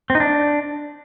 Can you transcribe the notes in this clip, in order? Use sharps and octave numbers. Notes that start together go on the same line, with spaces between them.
C4
D#4
D4